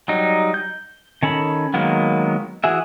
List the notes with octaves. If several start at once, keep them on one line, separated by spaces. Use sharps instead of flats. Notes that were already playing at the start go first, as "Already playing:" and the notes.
F#3 G3 D#4
G6
D#3 C#4 A4 B5
D#3 F#3 G#3 A#3 B3
E3 F#4 G#4 E5